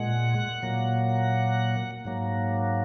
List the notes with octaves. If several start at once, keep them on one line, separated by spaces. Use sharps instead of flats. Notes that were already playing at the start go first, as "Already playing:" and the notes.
Already playing: A#2 G#3 F#5
A#2 F#3 A#3
G#2 F#3 A#3